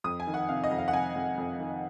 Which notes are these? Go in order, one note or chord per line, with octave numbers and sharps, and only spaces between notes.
F2 D#6
G#5
D#3
F#5
C3 F5
D#5
F2
F5
F#5
C3 G#5
F2
F2
D#3